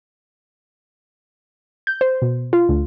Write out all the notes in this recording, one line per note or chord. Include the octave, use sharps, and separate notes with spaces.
G6
C5
B2
F4
D2